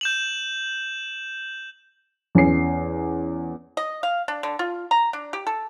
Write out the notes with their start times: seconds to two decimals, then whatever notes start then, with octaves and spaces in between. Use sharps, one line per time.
0.01 G6 E7 F#7
2.35 E2 C#4 C7
3.77 D#5
4.03 F5
4.28 D4
4.43 D3
4.59 F4
4.91 A#5
5.13 D4
5.33 G4
5.47 A4